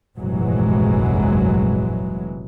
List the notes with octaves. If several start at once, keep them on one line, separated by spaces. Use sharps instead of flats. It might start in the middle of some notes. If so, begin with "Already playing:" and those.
F1 A#1 G2 E3 F#3 G#3